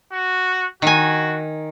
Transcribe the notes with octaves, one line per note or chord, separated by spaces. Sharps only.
F#4
D#3 F#4 G#5